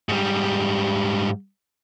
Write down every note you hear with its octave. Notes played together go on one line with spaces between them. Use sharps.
G#2 G3